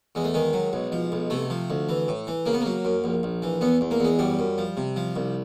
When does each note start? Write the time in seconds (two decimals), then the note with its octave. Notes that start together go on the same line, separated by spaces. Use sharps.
0.15 E2 G#3
0.24 A3
0.34 D#3 G#3
0.53 F#3
0.73 B1
0.92 F3
1.12 B1
1.30 C3 A3
1.50 F3
1.70 D2
1.89 E3
2.08 A2
2.27 E3
2.46 C#3 A#3
2.53 B3
2.61 A#3
2.66 F#3
2.85 F#2
3.04 A#1
3.23 A#1
3.43 E3
3.61 E2 B3
3.81 E2
3.91 A#3
4.00 E2 G#3
4.19 F#2 G3
4.39 F#2
4.58 F3
4.77 C3
4.96 F3
5.16 C2